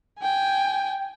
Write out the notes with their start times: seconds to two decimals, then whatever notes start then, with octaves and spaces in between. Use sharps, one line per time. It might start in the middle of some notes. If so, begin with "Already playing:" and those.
0.20 G5 G#5